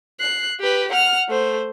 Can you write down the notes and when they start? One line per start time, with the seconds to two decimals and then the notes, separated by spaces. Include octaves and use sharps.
0.20 F#6 C7
0.60 G4 B4
0.92 F#5 F6
1.29 A3 C5